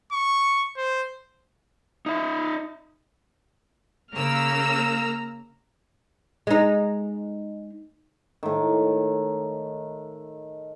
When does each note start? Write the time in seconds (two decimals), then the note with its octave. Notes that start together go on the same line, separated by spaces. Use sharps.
0.12 C#6
0.76 C5
2.06 D#4 E5
4.15 C#3 A#3 A#5 E6 F6
6.47 G#3 D#4
8.43 A2 D#3